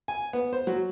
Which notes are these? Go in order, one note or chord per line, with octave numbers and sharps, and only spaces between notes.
G#5
B3
C5
F#3